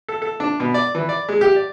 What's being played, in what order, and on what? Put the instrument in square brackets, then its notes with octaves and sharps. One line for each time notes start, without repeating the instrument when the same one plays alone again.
[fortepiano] A4
A4
D4
B2
D5
E3
D5
G#3
G4
D5